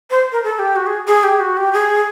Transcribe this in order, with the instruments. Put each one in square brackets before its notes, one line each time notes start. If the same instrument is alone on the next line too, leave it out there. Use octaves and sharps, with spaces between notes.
[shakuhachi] C5
A#4
A4
G4
F#4
G#4
G#4
G4
F#4
G4
G#4